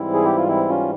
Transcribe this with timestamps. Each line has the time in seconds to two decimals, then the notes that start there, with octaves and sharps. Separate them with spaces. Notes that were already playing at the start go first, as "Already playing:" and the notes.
Already playing: G#2 E3 G3 C4 E4
0.13 G#4
0.25 G4
0.37 F4
0.48 C4 E4
0.69 C#4 F4